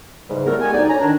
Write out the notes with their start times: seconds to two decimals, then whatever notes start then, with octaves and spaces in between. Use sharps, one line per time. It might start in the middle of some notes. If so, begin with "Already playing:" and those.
0.29 E2 G#2 C#3 G3
0.46 A2 G3 A3 B3 A4 A#4
0.61 G3 G#3 B3 G#5
0.73 D2 D#4 D5
0.88 C#4 G#5 A#5
1.01 D#3 D4